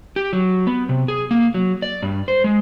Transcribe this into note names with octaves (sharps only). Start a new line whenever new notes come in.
G4
F#3
B3
C3
G#4
A#3
F#3
D5
G2
C5
G#3